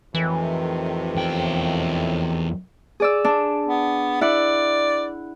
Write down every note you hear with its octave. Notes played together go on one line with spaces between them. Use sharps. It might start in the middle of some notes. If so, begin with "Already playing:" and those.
F2 A2 C3 D#3 E3
E2 G5
G#4 D5 E6
D4
B3
E4 D5 F#5